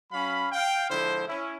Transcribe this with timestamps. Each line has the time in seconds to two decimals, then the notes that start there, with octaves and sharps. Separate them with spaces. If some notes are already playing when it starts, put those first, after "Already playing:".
0.11 F#3 C#4 F5 B5
0.51 F5 G5
0.90 D3 F3 G#3 E4 C5
1.27 C#4 E4